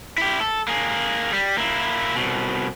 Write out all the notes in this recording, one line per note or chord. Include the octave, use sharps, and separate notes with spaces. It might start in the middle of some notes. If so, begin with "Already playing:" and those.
E4 G4
A4
A#3 G#4
G3
A#3 E4
C2 B2